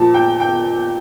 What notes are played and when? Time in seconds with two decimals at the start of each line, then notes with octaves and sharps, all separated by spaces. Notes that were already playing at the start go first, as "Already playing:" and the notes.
Already playing: A#2 F3 A5
0.14 G5
0.40 G5